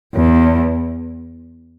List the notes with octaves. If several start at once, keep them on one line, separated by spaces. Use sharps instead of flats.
E2